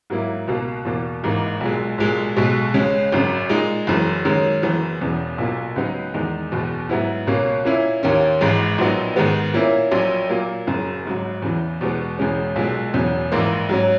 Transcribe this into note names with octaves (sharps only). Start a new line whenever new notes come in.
G#2 F#3 A#3 E4
C#2 B2 A#3
E2 B2 A#3
G#1 G#2 E3 A#3 D#4
B1 A#2 G#3
B1 A#2 G#3
B1 B2 G#3
C#2 C#3 G#3 C#4
G#1 F#2 C#3
A#2 G#3 D#4
F#1 F#2 E3
F#2 D#3 G#3 C#4
F#1 F#2 E3 B3
E1 E2 C#3 E3
B1 A#2 A#3
C#2 C#3 F#3 B3 D#4
E2 D#3 G#3 D#4
F#1 E2 B2
G#2 F#3 B3 E4
C#2 B2 A#3 C#4
A#2 A#3 C#4 E4
D#2 D#3 A#3 C#4
G#1 G#2 E3 G#3
A#1 A#2 F#3 B3 D#4
G#2 D#3 G#3 B3
A#2 A#3 C#4 E4
A#1 A#2 F#3 C#4
A#2 F#3 A#3
F#1 F#2 C#3
G#1 G#2 F#3
E2 C#3 E3
E2 B2 G#3 B3
E1 E2 C#3 G#3 C#4
B1 A#2 G#3
E1 E2 C#3 F#3 C#4
A#1 G#2 E3 A#3
G#2 F#3 C#4